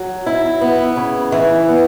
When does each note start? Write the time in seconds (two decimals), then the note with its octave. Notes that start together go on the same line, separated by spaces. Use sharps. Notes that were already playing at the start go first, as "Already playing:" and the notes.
Already playing: F#3
0.26 E4
0.61 B3
0.97 C#3
1.32 E3
1.68 B3